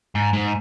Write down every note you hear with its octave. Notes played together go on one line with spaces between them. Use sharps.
G#2
G#2